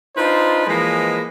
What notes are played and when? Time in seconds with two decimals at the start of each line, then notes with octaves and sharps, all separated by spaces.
0.16 D4 D#4 F4 B4 C5
0.67 E3 F3 G#3 A#3 B4 D#5